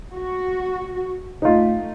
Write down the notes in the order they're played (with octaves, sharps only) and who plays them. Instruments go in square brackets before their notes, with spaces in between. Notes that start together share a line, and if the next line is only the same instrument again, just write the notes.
[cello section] F#4
[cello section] A3 [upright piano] D#4 F4